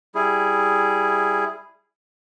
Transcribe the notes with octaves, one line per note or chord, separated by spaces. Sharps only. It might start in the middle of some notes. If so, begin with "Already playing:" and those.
G3 E4 G#4